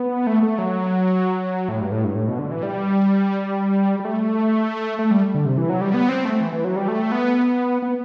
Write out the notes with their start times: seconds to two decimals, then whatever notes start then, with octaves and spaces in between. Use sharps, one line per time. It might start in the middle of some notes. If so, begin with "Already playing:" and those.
Already playing: B3
0.27 A3
0.43 A3
0.58 F#3
1.69 A2
1.80 G2
1.92 A2
2.04 G2
2.15 A2
2.28 B2
2.39 D3
2.51 E3
2.63 G3
4.00 G3
4.05 A3
4.99 A3
5.11 G3
5.34 D3
5.46 C3
5.58 E3
5.69 F#3
5.81 G3
5.94 B3
6.09 C4
6.25 A3
6.40 E3
6.53 E3
6.65 F#3
6.76 G3
6.88 A3
7.12 B3
7.82 B3